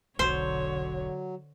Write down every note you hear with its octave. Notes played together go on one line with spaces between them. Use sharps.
E1 B1 D3 F#3 C5 C#5